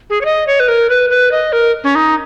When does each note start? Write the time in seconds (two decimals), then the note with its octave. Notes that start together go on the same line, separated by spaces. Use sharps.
0.10 G#4
0.21 C#5
0.25 D#5
0.47 C#5
0.60 B4
0.68 A#4
0.89 B4
1.10 B4
1.32 D#5
1.53 A#4
1.84 C#4
1.95 D#4